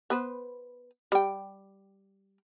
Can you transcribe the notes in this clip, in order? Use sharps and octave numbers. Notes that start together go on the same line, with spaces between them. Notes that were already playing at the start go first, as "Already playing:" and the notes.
B3 B4 C5
G3 G5